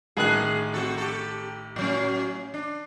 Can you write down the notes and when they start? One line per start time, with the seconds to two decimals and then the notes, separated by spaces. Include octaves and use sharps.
0.17 A1 D#3 G#4 F#6
0.74 C4 F#4 A4
0.98 G4 A4
1.76 A2 F#3 C#4
2.54 D4